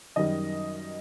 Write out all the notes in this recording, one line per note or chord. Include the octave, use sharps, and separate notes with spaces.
F#2 D#3 G3 D#5